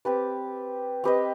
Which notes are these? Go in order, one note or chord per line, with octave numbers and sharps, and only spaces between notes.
C4 G4 B4 D5
C4 G4 B4 D#5